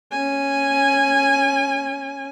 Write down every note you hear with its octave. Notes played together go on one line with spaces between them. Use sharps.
C#4 G#5